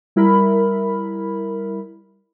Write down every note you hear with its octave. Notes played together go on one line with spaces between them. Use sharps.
G3 E4 A#4 B5